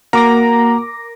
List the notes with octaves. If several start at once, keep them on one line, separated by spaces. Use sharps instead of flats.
A#3 F#4 A#4 F#5 A#5 D6 A#6